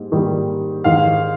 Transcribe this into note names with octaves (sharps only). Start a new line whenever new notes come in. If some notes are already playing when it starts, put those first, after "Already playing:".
Already playing: G#2 G3 A#3
G#2 D#3 G3 A#3
G#2 D#3 G#3 F5